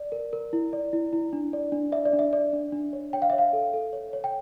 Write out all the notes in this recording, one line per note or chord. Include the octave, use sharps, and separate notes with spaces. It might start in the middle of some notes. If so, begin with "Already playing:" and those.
Already playing: D5
A#4
A#4
E4
D5
E4
E4
D4
D5
D4
D5 E5
D5
D4
E5
D5
D4
D4
C#5
C#5 G5
F5
C#5 E5
F5
A4
A4
C#5
C#5
G5